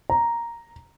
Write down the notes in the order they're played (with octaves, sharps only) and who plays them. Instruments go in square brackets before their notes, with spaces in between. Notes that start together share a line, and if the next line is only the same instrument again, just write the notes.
[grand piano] A#5